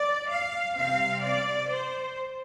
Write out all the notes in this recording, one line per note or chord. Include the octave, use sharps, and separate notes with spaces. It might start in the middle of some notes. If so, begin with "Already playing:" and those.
Already playing: D5
F5
C3 G3 C4 F5
D5
C5